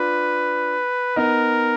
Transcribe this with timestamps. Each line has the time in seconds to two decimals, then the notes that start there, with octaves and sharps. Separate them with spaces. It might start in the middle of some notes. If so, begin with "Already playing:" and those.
Already playing: D4 F4 B4
1.16 B3 D#4 A#4